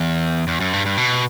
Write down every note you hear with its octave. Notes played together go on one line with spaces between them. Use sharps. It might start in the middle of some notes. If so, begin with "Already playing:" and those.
Already playing: E2
E2
F#2
G2
G2
B2